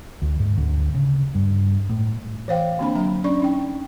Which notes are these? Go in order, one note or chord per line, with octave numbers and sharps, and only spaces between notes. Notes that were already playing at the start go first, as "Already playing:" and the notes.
D2
G#2
D2
C#3
G2
A2
E3 C5 F5 G5
D3 A#3 C4 D4 B5
F#3 A#5
C#4 D4 D5 C#6
C#4 D#4 G5